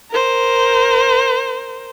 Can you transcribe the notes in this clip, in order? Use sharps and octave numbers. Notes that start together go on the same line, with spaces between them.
A#4 C5